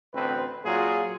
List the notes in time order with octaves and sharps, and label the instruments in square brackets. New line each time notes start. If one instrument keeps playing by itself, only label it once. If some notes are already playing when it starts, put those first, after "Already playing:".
[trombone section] A1 D2 C4 B4
A#2 F#3 F4 G#4